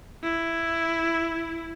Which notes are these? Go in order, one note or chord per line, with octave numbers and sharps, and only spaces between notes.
E4